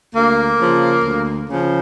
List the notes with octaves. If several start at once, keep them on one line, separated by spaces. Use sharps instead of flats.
D2 A#3
C#3 F3
D2
C#3 F3